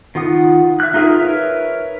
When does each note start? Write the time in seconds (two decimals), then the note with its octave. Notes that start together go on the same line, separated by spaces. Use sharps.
0.15 D#3 F4 F#5 D#6
0.80 E5 F#6
0.94 D#4 F4 G#4 A#4 E5
1.20 A#4 B4 C#5 E5